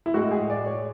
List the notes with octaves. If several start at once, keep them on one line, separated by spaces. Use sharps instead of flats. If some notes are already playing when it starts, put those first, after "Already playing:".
E4
A2 G#3 F#4
G#4
D5
C#5